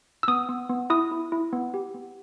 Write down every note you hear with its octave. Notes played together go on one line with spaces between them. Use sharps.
E6
B3 D#6
B3
B3
E4 D#6
E4
E4
B3
G4
B3